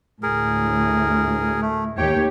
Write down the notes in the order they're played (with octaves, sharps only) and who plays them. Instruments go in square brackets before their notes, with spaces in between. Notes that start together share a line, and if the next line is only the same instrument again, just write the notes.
[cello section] D2 A2 [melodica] G#4 A#4
[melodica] A3
[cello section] D#2 G4 C#5 [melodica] G5